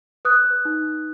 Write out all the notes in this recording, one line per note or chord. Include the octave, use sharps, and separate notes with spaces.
B4 D#6 F#6
B4
D#4